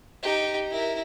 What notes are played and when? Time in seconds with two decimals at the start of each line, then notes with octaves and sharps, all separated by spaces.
0.22 D#4 G4
0.71 E4 A#4